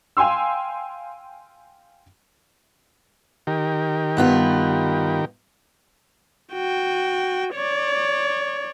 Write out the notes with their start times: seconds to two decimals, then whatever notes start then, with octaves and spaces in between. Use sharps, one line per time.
0.17 F5 G5 G#5 C6 E6
3.47 D#3 G4 A#4
4.17 G2 B3 F4
6.53 F#4 G5
7.54 C#5 D5